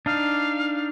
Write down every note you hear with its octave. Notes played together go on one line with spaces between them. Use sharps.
D4 D#4 F5